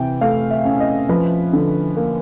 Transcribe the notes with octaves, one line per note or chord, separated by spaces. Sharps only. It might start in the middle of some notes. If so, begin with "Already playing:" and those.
Already playing: C3 E3 G5
A3 F5
E5
C#4
D#5
F3 B4
D3
A#3